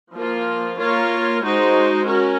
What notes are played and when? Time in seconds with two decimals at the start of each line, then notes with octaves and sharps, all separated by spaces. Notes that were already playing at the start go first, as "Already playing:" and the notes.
0.13 F3 A#3 F4
0.78 A#3 F4 A#4 C#5
1.42 G#3 D#4 F#4 C5
2.06 C#4 F#4 A#4